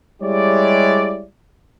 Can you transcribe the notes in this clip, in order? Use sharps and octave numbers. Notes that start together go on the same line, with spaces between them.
G3 G#3 E4 G4 C#5 D5